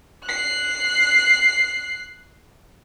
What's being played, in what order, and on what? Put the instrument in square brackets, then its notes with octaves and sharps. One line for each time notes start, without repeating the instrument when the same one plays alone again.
[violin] F#6 C7